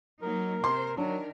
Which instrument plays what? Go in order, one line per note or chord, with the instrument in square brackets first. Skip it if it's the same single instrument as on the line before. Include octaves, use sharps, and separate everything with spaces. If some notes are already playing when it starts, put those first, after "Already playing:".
[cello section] F#3 A#3 D#4 [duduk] A#4
[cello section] C3 C5 [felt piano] C6
[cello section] D#3 A#4 [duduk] F#3 [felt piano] D4